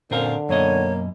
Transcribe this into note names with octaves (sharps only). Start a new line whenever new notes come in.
F#2 A#2 D3 C4 A#4 C5 F5
F#2 B2 A#3 C#5 D#5